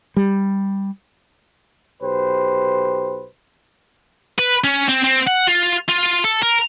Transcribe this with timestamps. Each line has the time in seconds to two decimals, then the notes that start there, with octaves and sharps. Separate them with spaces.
0.17 G3
2.01 B1 G4 B4 C5
4.39 B4
4.64 C#4
4.88 C4
5.03 C4
5.27 F#5
5.47 F4
5.89 F4
6.24 A4
6.43 A#4